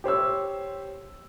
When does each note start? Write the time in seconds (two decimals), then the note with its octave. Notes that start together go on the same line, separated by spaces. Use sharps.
0.04 G4 C5 C#5 E6